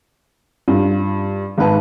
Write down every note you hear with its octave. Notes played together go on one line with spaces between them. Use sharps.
G2 F4
G#1 G#2 B4 A5